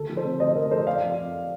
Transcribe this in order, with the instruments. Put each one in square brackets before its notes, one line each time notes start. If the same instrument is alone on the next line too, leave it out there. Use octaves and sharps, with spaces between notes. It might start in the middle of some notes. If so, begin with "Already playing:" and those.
Already playing: [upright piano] D2 A4
F3
A4 C5
C3
D2 C5 D#5
F3 A#4
F3 A4 C5
F2 D5 F5
F2
F2